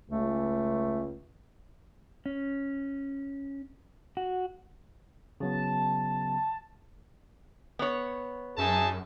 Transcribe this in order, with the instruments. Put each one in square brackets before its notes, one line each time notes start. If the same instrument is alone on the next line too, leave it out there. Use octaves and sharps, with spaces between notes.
[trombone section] C#2 [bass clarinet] A3
[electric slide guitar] C#4
F#4
[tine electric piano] C#3 F#3 B3 [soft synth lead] A5
[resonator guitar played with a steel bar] B3 C#5
[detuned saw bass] F#2 [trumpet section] D#4 E5 A5 [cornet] G#4